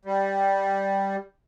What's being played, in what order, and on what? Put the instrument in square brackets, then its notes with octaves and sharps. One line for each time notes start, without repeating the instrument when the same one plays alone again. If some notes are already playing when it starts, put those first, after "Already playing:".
[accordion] G3